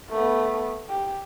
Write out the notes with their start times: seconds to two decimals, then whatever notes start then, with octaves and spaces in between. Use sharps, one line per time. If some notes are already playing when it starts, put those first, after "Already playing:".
0.11 A3 B3
0.89 G4